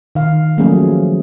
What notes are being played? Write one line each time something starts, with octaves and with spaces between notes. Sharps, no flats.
D#3 F5
F3 F#3 A3 A#3 C#4 G#4